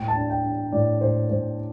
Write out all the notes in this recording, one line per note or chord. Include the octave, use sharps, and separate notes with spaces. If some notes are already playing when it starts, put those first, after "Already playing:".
Already playing: A2 G5
A5
D4
G5
D4
A2 D5
A2 C5
A2 C5